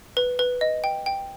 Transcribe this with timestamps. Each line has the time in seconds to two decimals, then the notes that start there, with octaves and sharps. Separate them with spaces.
0.17 B4
0.39 B4
0.61 D#5
0.84 G5
1.06 G5